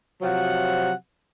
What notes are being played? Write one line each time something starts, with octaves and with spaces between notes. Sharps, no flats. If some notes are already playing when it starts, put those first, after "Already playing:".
C3 F3 F#3 F#5